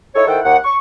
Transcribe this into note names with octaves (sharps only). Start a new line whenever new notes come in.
D#4 E4 A4 C#5
D#3 E4 A4 C5 F#5 G5
D#2 F#5
C#6